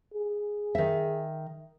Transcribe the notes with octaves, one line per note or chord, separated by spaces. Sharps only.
G#4
D#3 E5